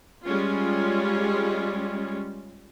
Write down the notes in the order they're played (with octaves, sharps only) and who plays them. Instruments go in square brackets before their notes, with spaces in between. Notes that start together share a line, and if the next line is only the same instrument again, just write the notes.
[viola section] G3 G#3 C#4 F4